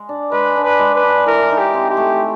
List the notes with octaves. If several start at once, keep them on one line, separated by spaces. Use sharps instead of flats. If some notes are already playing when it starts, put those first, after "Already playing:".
Already playing: G#3
D4
G#3 B4
D4
B4
G#3
B4
D4
E3 A#4
D#4
G4
C4
G4
A3